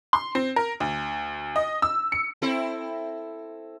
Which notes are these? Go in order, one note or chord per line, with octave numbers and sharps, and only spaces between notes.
C6
C4
A#4
D2
D#5
E6
C#7
C4 E4 A4